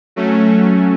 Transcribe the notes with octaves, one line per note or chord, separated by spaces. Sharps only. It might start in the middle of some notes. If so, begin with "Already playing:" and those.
F#3 A3 C#4